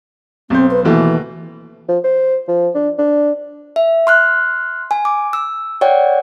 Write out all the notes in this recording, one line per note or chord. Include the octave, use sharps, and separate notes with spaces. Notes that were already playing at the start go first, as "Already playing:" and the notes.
B1 C4 C5
B4
D#2 B2 E3 A3
F3
C5
F3
D4
D4
E5
C6 F6 F#6
G#5
D6
E6
C#5 D5 F#5 G5